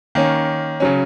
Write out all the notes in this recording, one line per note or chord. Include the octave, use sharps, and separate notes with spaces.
D#3 A#3 C#4
C#3 F#3 C#4